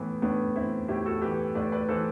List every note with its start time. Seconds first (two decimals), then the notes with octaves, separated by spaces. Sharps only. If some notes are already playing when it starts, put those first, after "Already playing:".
Already playing: A2 E3 B3
0.22 A2 B3 D4
0.55 E3 C4 E4
0.88 A2 E4 G4
1.06 F#4 A4
1.22 E3 G4 B4
1.55 A2 B4 D5
1.72 B4 D5
1.89 E3 A4 C5